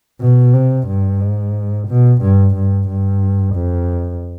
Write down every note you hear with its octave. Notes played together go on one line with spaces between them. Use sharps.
B2
C3
G2
G#2
B2
G2
G2
G2
F2